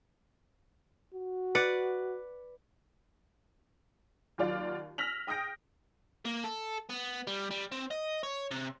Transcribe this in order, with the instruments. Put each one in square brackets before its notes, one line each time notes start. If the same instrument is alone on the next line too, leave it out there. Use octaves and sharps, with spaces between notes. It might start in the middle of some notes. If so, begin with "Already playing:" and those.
[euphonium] F#4
[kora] B4 D5 F#5
[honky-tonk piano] D#2 F#3 F4 D5 F5
E6 F6 A#6 B6 F7 F#7
G5 D#6 G6 A#6 D7
[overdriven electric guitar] A#3
A4
B3
G3
G3
C4
D#5
C#5
C3